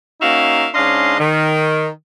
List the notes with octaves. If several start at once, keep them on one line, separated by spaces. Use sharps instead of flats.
A#3 C#4 D#4 F#4 E5 F5
G#2 C#4 D4 D#5 F5 C6
D#3